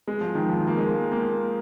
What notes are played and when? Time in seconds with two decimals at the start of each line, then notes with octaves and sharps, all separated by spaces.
0.08 G#3
0.21 F3
0.35 D#3
0.49 F3
0.67 A#3
0.78 G#3
1.12 A#3